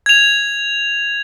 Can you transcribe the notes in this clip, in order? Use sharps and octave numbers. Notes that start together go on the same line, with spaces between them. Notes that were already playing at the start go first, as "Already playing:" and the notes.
G#6 F7